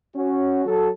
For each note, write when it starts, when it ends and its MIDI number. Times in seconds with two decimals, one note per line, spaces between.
0.14 0.65 61
0.14 0.65 66
0.66 0.89 54
0.66 0.89 69